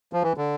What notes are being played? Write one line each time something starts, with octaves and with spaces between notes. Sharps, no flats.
F3
E3
D3